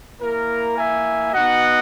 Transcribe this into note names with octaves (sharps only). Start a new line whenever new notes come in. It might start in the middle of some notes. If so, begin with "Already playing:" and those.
A#3 E4 A#4
E5 G#5
B3 D#4 F#4 D#5 F#5